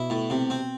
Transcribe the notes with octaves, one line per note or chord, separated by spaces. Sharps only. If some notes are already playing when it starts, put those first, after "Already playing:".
Already playing: B2 E4
A2
C3
C4